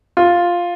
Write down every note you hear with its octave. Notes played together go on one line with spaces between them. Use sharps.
F4